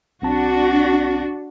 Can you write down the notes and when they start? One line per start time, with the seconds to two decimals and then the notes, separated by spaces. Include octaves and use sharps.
0.22 B1 C4 D4 F#4 A5